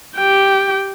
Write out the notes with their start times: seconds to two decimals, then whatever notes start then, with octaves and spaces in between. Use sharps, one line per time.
0.17 G4 G5